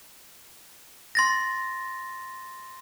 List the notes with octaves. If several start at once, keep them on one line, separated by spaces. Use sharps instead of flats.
C6 A6 A#6